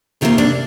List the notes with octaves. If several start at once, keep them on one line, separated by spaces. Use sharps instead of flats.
D2 C3 D#3 G3 A#3 F4
D4